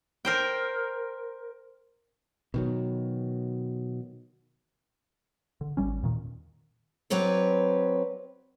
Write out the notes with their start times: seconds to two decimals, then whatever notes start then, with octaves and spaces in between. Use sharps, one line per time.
0.25 A#4 C5 G5
2.54 B2 D#3 F#3
5.61 D3
5.77 G#1 G3 C#4
6.02 E2 A#2 D#3
7.10 F#3 C4 B4 C#5 D5